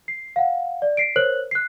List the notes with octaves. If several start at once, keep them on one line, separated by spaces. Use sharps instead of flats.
C7
F5 F#5
D5
B6 C7 D7
A#4 C5 C#5 F6 F#6 F#7
F#6 C7